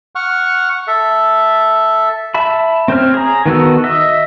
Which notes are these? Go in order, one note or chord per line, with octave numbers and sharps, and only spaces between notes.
F#5 C#6 F6
A4 E5
E5 A5 B5
C4 C5 C#5 F6
G#4 A#5
D#3 B3 F#4 A4
D#5 E5